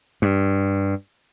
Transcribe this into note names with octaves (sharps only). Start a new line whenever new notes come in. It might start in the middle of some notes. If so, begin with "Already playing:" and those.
G2